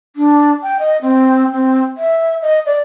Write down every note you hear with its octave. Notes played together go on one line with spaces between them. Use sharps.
D4
G5
D#5
C4
C4
E5
D#5
D5